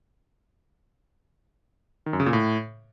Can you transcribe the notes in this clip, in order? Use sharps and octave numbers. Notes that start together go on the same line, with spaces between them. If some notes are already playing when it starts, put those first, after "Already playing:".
D#3
F#2
C#3
A#2
A2